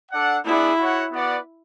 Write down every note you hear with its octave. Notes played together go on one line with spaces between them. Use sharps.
D4 A4 D5 F#5
B3 D4 E4 G#4 D5 F#5
F#4 C#5 F#5
B3 F#4 B4 D5 F#5